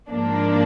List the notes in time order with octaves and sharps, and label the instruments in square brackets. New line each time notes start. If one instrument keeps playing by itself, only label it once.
[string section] G#2 F3 A#3 D4